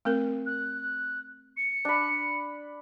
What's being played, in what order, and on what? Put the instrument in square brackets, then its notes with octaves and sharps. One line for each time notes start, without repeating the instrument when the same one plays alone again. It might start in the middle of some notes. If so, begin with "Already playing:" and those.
[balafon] A3 C4 A#4
[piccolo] F#6
C#7
[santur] D4 B5